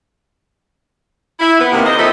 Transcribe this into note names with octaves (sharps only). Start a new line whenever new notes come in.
E4
B3
C3 D#3 A#3
D3 D#4 C5 D#5
F3 G3 C4 A4 D#5 E5